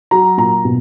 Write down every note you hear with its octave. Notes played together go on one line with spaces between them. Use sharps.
F#3 A#5
A#2 A#5
B2